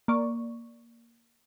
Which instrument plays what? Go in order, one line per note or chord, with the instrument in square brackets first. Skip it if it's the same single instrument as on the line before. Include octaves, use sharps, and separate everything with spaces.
[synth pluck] A#3 D5 C#6